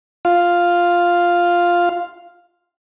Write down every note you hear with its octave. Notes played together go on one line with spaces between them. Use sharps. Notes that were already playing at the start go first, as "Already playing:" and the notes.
F4 F5